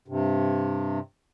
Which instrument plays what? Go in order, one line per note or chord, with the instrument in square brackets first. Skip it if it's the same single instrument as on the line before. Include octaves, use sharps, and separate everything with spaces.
[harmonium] G2 C3